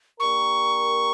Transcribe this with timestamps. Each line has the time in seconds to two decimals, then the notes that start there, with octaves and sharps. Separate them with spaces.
0.19 A#3 D4 G4 A#4 C#6